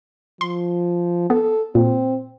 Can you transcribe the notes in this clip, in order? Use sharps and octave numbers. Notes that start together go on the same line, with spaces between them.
F3 C6
B3 A4
A#2 C4